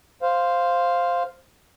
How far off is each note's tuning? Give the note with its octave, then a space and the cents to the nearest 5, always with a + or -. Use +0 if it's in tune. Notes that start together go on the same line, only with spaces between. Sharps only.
C5 +0 F5 +0